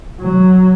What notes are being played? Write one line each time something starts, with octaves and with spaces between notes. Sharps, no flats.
F#3